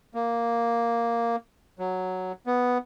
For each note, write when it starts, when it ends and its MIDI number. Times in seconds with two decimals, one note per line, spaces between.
0.14 1.36 58
1.79 2.32 54
2.46 2.78 59